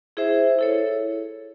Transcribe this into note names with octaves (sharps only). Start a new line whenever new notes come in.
E4 G#4 C5 E5
E4 A4 C#5